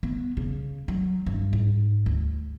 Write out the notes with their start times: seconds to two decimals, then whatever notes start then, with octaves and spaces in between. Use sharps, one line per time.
0.03 B3
0.37 C#3
0.88 F#3
1.26 G2
1.53 G#2
2.06 D2